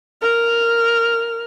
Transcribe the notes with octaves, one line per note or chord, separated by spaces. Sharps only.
A#4 F6